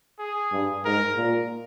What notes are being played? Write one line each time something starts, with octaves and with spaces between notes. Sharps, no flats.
G#4
G2
G#2 A#4
A#2